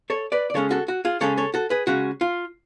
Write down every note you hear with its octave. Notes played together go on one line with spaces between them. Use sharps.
A4 C#5
B4 D5
D5
C#3 G#3 C#4 A4 C#5
F#4 A4
F#4
F4 G#4
C#3 G#3 C#4 A4 C#5
A4 C#5
F#4 A4
G#4 B4
C#3 G#3 C#4 F#4
F4